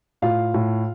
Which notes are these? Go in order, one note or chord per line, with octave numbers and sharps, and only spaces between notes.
A2 F4 F5
A2